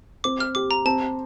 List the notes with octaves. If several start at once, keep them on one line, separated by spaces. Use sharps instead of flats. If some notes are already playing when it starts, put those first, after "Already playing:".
C4 D6
F6
G4 D6
A#5
C4 A5